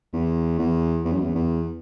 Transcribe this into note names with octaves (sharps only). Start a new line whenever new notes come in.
E2
E2
E2
F#2
E2
E2